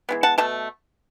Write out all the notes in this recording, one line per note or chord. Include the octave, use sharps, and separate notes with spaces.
E3 G#3 B3
F#5 A5
B2 A3 A5